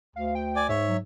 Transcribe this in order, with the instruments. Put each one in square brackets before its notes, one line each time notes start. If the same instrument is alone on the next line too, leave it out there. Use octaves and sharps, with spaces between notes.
[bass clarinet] D2 [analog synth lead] F5
[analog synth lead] G5
[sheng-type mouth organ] D5 G#5 D6
[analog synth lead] G#2 [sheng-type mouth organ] C#5 E5
[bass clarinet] F#3